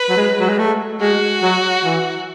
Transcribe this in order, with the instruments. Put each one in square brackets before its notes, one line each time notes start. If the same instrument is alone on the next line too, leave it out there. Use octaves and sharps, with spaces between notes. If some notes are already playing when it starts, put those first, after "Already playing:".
Already playing: [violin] B4
[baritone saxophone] F#3
G#3
F#3
G#3
A3
[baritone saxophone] G#3 [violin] F#4
[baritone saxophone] F#3
E3